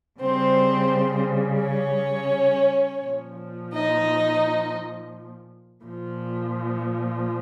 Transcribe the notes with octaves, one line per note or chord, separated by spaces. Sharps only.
C#3 G3 C4 C5
C#4 C#5
A#2 F3
D#4 D#5
A#2 F3